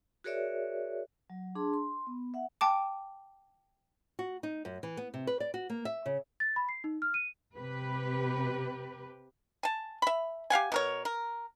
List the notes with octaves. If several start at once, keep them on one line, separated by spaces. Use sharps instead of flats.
F#4 G#4 A#4 C#5 D5 E5
F#3
D4 G#4 A5 C6
C6
B3
E5 F#5
G5 A5 D6
F#4
D#4
F#2
E3
B3
C3
B4
D5
F#4
A#3
E5
C#3
A6
B5
C7
D#4
F6
D#7
C3 G4 B4
G#5 A5
E5 B5
G4 F5 F#5 G#5
B2 A#4 C#5
A#4